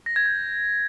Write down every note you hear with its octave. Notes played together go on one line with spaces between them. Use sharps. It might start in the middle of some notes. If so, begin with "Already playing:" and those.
A#6
G#6
G6